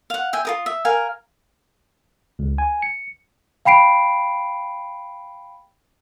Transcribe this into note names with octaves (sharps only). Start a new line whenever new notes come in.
F5 F#5
E5 G5 G#5
F4 A#4 D#6
E5
A#4 F5 G#5
C#2
G#5
C#7
F5 G5 B5 C7 D7